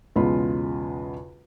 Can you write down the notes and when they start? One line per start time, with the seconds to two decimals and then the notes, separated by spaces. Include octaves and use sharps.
0.16 B1 E2 C#3 G#3 F4 B5